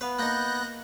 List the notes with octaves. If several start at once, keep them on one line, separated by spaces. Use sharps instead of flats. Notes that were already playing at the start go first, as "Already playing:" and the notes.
B3 B4 F5
A#3 D#4 F#6 G6 A#6